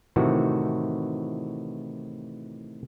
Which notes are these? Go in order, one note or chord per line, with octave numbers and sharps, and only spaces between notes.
A2 C3 D#3 E3 F#4